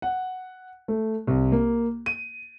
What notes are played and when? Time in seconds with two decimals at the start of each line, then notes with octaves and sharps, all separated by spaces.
0.02 F#5
0.88 A3
1.27 C2
1.52 A#3
2.06 D#7